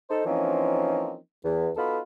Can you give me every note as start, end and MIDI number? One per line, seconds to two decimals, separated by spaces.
0.10 0.23 63
0.10 0.23 69
0.10 0.23 72
0.26 1.16 52
0.26 1.16 53
0.26 1.16 58
0.26 1.16 60
0.26 1.16 61
0.26 1.16 63
1.44 1.69 40
1.77 1.99 59
1.77 1.99 63
1.77 1.99 65
1.77 1.99 66
1.77 1.99 69
1.77 1.99 83